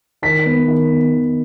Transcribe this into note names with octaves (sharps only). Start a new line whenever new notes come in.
D#3 B6
B3
D#3
B3
D#3